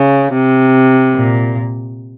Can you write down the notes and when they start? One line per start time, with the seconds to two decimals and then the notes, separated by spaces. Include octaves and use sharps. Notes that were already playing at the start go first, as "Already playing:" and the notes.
Already playing: C#3
0.32 C3
1.14 A#2